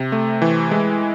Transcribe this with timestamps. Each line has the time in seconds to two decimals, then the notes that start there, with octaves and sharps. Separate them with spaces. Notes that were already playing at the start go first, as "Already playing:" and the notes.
Already playing: C3
0.12 A3
0.42 E3
0.71 G#3